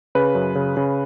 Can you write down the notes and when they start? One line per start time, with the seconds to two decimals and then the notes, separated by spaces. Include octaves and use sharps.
0.15 C#3 B4
0.35 F#2
0.55 C#3
0.77 C#3